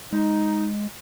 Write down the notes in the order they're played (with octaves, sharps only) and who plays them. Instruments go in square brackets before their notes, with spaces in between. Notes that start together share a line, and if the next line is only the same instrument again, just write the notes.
[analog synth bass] G#3 [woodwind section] D#4